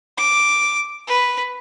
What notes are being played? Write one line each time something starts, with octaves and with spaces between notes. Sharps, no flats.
D6
B4